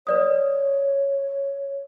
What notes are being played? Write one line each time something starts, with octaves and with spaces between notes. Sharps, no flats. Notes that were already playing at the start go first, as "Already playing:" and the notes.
B4 C#5 D5 D#6